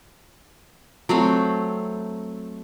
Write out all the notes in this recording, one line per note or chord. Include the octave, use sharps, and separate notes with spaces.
F#3 A3 C4